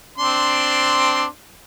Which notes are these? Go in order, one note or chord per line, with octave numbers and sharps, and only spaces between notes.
C4 D4 C6